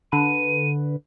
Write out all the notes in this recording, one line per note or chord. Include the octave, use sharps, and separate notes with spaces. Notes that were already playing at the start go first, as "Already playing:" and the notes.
D3 B4 D#7